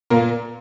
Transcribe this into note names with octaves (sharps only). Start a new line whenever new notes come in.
A#2 A#3 A#4